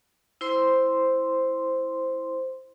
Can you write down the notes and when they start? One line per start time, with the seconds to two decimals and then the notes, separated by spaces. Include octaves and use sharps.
0.41 E4 C5 C6